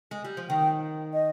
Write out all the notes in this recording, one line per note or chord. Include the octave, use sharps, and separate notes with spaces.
G#3
G3
F3
D#3 G5
D#5